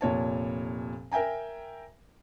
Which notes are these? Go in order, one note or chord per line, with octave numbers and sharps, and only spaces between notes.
F1 A#2 C#5 A5
A#4 E5 G5 G#5 A#5